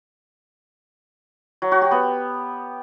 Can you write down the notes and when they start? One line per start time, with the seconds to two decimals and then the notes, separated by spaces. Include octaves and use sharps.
1.62 F#3
1.72 F#4
1.81 G4
1.91 B3